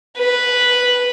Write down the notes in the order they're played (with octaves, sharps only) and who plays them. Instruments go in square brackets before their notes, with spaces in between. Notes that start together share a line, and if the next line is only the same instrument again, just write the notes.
[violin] B4